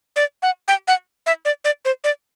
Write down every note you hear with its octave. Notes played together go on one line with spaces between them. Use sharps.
D5
F#5
G5
F#5
E5
D5
D5
C5
D5